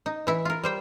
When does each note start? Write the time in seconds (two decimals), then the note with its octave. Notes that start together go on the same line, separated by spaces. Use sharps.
0.06 D#4
0.27 E3 E4
0.45 F4 A#4
0.63 G3 C5 G5